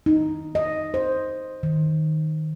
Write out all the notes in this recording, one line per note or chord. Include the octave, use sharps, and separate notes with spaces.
D#4
D#5
C5
D#3